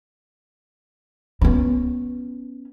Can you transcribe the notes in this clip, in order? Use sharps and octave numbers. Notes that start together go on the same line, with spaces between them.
B3 C#4